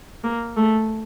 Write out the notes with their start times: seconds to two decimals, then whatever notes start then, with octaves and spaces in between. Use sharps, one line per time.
0.24 A#3
0.56 A3